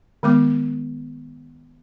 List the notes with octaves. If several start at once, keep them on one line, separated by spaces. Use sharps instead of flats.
D#3 G#3 B3 D6